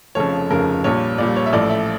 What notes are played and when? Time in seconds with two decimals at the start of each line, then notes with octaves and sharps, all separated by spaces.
0.15 F1 F2 C#3 F3 C#5
0.50 F1 F2 C#3 F3 A#4
0.84 A#1 A#2 G3 C#5
1.18 A#1 A#2 G3 D5
1.36 C#5
1.46 E5
1.53 A1 A2 F3 D5
1.70 E5